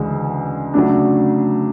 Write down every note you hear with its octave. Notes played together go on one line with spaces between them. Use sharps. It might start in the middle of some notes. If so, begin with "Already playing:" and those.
Already playing: D2 C#3 E3 G#3
C#3 F#3 A3 D4